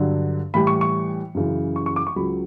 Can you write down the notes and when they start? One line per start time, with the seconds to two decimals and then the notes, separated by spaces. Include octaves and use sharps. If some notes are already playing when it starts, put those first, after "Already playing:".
Already playing: G2 D3 F#3
0.54 A2 E3 G3 B5
0.67 C#6
0.81 C#6
1.35 F#2 C#3 E3
1.76 C#6
1.86 C#6
1.96 D6
2.07 C#6
2.16 C#2 C#3 F#3 B5